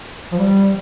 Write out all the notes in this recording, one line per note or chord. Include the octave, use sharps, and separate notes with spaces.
F3
G3